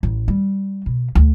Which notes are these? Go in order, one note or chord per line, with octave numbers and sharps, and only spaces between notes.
A1
G3
B2
D2